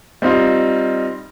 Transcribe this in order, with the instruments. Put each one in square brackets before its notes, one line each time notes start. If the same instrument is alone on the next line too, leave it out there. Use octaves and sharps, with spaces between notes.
[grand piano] G3 C4 D#4 F4